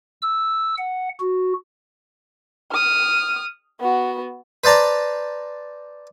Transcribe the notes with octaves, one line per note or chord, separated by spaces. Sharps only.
E6
F#5
F#4
D#6 F6
B3 F#4
B4 C5 D5 A5 A#5